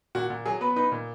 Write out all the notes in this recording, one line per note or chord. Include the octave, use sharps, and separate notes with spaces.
A#2 F#4
A#2
F#3 G#4
B3 B4
D#4 B4
A#2